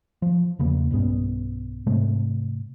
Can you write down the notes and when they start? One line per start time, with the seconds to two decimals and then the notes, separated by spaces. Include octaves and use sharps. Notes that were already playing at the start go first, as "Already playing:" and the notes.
0.22 F3
0.59 E2 C#3 A#3
0.91 B1 G2 B3 C#4
1.87 G#2 C3 G#3 A3